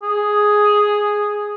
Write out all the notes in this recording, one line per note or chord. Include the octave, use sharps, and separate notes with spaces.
G#4